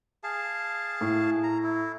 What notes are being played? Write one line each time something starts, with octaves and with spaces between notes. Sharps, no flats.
G#4 F5 A5
A2
A#5
E4